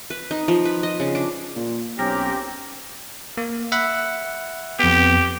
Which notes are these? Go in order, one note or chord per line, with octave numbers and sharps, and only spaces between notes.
B4
D#4
F3
B4
D#5
C#3
D4
A#2
B1 C4 C#4 G4 A#4
A#3
E5 F#5 B5
F2 B3 G4